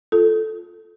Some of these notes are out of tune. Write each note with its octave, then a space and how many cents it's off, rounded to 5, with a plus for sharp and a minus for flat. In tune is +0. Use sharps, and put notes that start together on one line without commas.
F4 +0 A4 +0